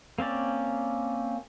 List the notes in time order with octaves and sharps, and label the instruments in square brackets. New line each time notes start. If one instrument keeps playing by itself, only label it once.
[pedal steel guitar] A#3 C4 C#4 D5